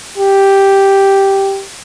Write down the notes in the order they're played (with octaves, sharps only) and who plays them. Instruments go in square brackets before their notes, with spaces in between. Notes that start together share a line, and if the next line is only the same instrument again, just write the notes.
[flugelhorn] G4